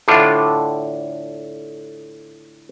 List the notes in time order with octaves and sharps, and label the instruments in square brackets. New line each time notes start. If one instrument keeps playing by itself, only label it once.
[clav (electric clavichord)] A2 D3 D4 F4